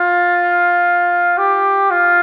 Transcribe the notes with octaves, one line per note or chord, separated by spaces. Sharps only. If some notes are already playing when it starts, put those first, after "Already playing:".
Already playing: F4
G4
F4